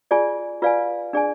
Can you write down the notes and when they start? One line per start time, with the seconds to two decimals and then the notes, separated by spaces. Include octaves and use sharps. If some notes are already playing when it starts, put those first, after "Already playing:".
0.11 F4 G#4 D5 G#5
0.62 F4 B4 D5 F5 G#5
1.13 D4 G#4 D5 G#5